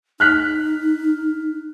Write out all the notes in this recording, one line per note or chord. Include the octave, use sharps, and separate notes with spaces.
D#4 F6 F#6 B6